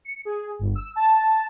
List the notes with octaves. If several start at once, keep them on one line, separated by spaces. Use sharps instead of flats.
C#7
G#4
G1
E6
A5